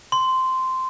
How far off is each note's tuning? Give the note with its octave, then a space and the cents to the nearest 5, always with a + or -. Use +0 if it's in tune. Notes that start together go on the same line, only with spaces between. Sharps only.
C6 -10